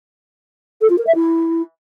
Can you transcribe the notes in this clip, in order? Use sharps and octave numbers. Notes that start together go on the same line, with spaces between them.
A4
F4
A#4
E5
E4